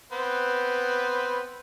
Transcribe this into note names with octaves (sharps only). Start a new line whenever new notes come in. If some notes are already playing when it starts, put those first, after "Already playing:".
B3 C4 B4